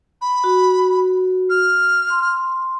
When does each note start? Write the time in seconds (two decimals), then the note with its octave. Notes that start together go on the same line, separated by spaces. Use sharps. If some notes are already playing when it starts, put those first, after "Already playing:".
0.21 B5
0.44 F#4
1.50 F6
2.10 C6